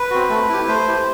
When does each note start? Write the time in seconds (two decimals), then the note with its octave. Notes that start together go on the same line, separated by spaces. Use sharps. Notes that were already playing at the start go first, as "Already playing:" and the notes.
Already playing: B4
0.11 C4 F#4
0.29 A3
0.49 E4 G4
0.68 A3 C5
0.87 E4 G4